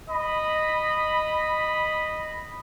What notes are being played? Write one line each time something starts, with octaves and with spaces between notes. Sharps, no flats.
D#5 B5